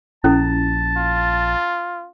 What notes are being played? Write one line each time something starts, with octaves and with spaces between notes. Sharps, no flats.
A#1 C#4 E4 A4 A5
F4